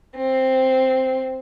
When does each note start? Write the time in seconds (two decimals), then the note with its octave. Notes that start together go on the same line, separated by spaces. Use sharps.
0.16 C4